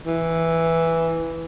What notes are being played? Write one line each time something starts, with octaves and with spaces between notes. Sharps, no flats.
E3